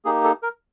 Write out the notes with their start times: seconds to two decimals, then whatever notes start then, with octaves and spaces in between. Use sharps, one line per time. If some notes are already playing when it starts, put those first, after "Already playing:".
0.05 A#3 D#4 G4 G#4
0.24 A4
0.43 A#4